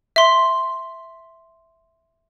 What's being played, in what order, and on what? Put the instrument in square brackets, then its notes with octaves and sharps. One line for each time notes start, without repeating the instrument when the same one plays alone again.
[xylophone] E5 C6